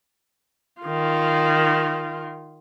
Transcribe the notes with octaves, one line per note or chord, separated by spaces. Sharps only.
D#3 F4